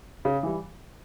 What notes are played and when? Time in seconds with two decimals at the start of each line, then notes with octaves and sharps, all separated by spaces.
0.25 C#3
0.43 E3 G3